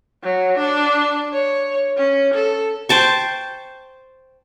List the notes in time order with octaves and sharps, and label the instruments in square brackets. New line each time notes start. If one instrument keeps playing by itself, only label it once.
[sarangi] F#3
D4
C#5
C#4
A4
[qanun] C5 G5 A5 C#6